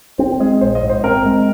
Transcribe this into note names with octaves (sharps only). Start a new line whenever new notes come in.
C4 C5
G#3 G#4
A#1 C5
D#5
G#2
C5
C4 A#4
G#3